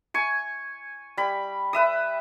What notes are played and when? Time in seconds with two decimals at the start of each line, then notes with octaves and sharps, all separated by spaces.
0.14 G#5 C#6
1.17 G3 B5
1.73 B4 E5 D#6